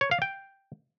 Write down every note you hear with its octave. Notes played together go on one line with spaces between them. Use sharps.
C#5
F5
G5